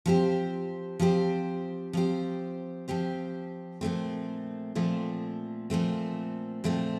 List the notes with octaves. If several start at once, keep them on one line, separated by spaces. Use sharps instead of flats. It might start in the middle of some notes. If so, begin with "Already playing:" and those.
F3 C4 G4 C5
F3 C4 G4 C5
F3 C4 G4 C5
F3 C4 G4 C5
A#2 F3 A3 C4
A#2 F3 A3 C4
A#2 F3 A3 C4
A#2 F3 A3 C4